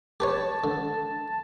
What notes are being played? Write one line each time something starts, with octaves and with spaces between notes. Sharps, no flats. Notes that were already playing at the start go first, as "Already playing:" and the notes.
G4 B4 C#5 A5
D3